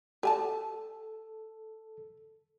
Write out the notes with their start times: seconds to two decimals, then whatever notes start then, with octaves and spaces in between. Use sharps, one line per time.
0.23 G4 A4 G#5 A5